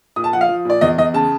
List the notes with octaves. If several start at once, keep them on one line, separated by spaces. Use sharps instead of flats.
A#2 D#6
A5
F3 F#5
F5
F3
A#2 D5
E2 D#5
E2 D#5
C#3 A5